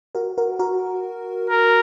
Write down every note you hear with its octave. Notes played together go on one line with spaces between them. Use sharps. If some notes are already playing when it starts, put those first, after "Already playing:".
F#4 A#4
F#4 A#4
F#4 A#4
A#4